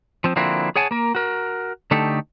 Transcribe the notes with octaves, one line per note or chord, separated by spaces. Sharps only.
F3 C4
D3 F3 A#3 C4 E4 F#4
G#4 C#5 F#5 G#5 A5
A#3 A#4
F#4 A#4
D3 A3 D#4 G4 A4